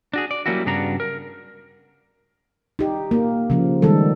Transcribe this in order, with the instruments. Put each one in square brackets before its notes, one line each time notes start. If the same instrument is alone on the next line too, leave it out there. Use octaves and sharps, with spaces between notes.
[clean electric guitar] D4 F#4 G#4
D5
F#3 G3 A#3 C#4 E4 F#4
G2 C#3 B3 D4 F#4 A#5
A#4
[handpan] D#4 G4
A#3
C#3 F3
D#3 G3 G#3 A4